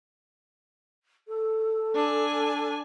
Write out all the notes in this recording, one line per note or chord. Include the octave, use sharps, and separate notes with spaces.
A4
D4 G#5